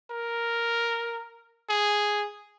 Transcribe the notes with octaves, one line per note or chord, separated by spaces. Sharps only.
A#4
G#4